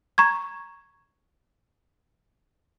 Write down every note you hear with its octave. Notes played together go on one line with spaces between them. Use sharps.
A#5 C#6 G#6